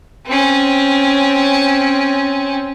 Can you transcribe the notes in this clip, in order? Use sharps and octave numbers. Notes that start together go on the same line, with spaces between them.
C4 C#4